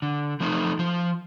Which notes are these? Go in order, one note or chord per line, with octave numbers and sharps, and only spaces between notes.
D3
F3 A3 C4 D#4
F3